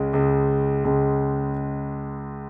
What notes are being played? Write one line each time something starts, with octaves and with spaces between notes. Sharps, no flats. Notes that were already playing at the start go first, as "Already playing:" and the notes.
Already playing: C#2 C#3 G#3
C#2 C#3 G#3
C#2 C#3 G#3